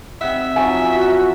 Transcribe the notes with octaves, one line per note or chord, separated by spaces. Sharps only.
C3 E5 F#5
F3 F#3 C#4 G#5
F#4